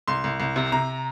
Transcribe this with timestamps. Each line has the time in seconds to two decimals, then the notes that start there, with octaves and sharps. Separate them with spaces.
0.08 C2 C6
0.24 C2
0.40 C2
0.56 C3
0.72 C3 A#5